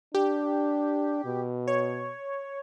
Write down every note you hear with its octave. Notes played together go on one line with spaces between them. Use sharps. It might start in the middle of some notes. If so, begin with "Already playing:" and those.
D4 G4
B2
C#5